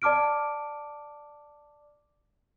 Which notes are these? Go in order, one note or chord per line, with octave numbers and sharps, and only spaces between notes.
D5 A5 D6 F6 D7